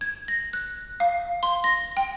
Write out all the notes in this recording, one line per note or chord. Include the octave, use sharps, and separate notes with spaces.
G#6
A#6
F#6
F5
C6
A#6
G5